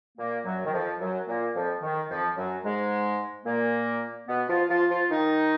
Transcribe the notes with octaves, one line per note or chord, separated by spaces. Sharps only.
A#2 A#3
F#2 F#3
D#3
F2 F3
F#2 F#3
A#2 A#3
F2 F3
D#3
F2 F3
F#2 F#3
G#2 G#3
A#2 A#3
B2 B3
F3 F4
F3 F4
F3 F4
D#3 D#4